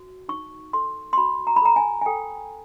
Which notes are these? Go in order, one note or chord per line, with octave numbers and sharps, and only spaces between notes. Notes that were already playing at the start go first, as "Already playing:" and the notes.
Already playing: F#4
D#4 C#6
A4 C6
C6
F#4 B5
A#5
B5
A4 A#5
G#5
G#5
A4 G5